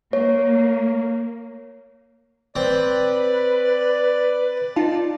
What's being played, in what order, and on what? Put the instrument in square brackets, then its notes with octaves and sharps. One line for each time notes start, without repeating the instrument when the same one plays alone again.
[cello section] A#3 [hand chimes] C#5
[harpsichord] C4 [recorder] B4 [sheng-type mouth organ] D5
[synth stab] D#4 F4 A5